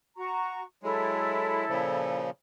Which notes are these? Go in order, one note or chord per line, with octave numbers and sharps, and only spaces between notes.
F#4 A#5 C#6
F#3 G#3 E4 A4
A#2 C#3 F3